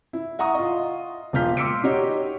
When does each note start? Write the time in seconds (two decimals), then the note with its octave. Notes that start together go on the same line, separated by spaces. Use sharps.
0.13 E4
0.39 E5 F#5 A#5 C#6 D#6
0.55 F4 D#5
1.33 E1 A#3 F4 F6 G6 B6
1.57 C6 D6 E6 B6 C#7 D7
1.84 D#4 F#4 G4 C#5 D#5